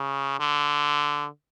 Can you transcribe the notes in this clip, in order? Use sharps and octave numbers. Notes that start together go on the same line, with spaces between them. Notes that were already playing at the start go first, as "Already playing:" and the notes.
Already playing: C#3
D3